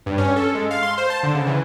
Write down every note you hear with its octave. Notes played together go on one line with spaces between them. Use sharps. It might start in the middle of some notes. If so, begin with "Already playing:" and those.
G2
C#4
A4
G#3
F5
C6
C5
A5
D3
C#3
E3